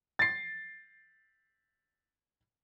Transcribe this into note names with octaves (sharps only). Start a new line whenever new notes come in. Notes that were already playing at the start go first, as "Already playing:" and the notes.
A6 C7